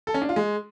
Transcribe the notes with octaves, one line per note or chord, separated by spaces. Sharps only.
A4
C#4
D4
F4
G#3